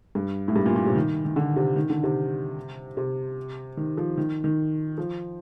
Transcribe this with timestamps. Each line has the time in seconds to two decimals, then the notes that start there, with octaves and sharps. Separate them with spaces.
0.15 G2
0.48 A2
0.56 G2
0.66 A#2
0.76 A#2
0.86 C3
0.96 D#3
1.25 D#3
1.36 D3
1.56 C3
1.76 D#3
1.90 D3
2.03 C3
2.97 C3
3.77 D#3
3.97 F3
4.18 D#3
4.44 D#3
4.98 F3